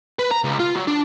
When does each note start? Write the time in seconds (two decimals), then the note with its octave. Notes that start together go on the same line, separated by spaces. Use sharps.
0.19 B4
0.31 A#5
0.44 C#2
0.60 F4
0.76 F#3
0.87 D4